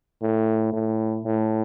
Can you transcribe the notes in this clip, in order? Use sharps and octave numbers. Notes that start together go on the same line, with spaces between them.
A2
A2
A2